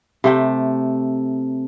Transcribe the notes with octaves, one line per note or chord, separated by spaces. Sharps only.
C3 A3 G5